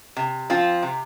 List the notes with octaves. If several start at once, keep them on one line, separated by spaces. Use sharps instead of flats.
C3
F3 C4 F4
C3